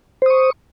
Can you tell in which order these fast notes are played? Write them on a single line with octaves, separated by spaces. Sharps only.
C5 D#6 C#6